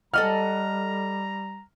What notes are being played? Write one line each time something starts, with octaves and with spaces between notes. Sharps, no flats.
G3 A4 D#5 F#5 A#5 F6